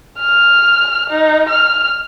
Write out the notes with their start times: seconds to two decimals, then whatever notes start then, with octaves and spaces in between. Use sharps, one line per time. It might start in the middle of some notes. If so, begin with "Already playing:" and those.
0.19 F6
1.10 D#4
1.49 F6